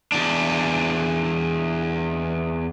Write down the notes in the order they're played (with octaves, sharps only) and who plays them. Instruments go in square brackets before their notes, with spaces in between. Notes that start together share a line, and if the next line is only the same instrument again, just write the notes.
[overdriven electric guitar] E2 D4